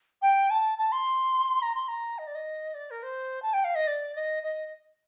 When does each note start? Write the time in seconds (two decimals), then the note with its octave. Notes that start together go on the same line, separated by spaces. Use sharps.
0.22 G5
0.50 A5
0.78 A5
0.92 C6
1.62 A#5
1.75 C6
1.88 A#5
2.19 D#5
2.27 D5
2.35 D#5
2.74 D5
2.91 A#4
3.03 C5
3.42 A5
3.53 G5
3.64 F5
3.75 D#5
3.87 D5
4.16 D#5
4.43 D#5